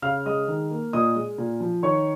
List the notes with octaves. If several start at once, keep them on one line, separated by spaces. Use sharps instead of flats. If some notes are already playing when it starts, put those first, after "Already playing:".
C#3 F5 F6
G#3 D#5 D#6
D#3
A#3
A#2 D#5 D#6
G#3
A#2
F3
D#3 C#5 C#6